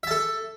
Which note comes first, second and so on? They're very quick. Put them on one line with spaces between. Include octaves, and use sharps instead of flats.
E5 A5 A4